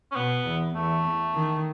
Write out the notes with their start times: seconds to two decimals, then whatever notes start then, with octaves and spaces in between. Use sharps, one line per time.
0.12 C#4
0.16 B2 B3
0.46 E2
0.75 E2 A3
1.34 D#3